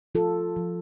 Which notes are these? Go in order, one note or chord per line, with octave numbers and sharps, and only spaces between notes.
F3 F4 A4
F3